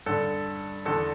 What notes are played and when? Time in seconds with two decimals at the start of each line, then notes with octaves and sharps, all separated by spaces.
0.06 G2 D3 A4
0.85 E2 D3 A4